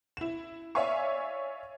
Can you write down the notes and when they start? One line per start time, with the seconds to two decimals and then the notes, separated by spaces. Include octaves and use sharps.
0.17 E4 E7
0.75 C#5 D5 E5 F5 G#5 C#6